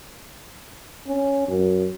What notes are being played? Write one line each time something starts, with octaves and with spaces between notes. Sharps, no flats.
C#4
F#2